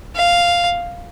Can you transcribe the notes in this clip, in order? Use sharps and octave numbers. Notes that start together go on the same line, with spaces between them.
F5